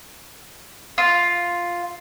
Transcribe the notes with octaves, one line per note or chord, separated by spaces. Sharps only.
F4